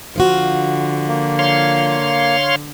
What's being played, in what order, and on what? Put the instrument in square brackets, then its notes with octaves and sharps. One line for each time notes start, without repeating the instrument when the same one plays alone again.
[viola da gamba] D3 [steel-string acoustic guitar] F3 F4 F#4
[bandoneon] A#3
[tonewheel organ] C#5 F5 C6